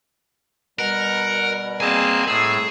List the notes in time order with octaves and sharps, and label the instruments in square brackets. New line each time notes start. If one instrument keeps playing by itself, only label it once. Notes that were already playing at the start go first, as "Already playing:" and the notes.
[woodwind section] B2 G3 [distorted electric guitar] A#4 [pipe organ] F#5
[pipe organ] A#3 C4 G#4 [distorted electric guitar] G#5 A5
[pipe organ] A2 E6 [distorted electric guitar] G#4